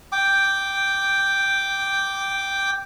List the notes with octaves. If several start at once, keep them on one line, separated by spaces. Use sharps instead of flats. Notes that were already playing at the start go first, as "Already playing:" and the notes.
G5 D6